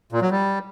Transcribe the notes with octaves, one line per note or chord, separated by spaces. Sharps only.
A#2
F#3
G3